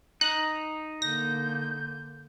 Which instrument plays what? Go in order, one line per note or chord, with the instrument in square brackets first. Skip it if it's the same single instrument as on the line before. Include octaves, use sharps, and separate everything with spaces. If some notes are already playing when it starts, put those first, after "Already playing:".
[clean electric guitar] D#4 [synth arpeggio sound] F#6
[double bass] D3 A#3 [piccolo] G6 [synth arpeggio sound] A#6